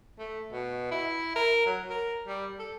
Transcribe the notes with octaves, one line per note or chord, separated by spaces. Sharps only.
A3
B2
E4
A#4
F#3
A#4
G3
A4